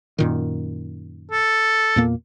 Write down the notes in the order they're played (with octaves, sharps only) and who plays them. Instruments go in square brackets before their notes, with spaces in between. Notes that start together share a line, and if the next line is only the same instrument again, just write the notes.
[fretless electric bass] F#2 A#2 D#3
[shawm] A4
[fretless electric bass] E2 A#2 A#3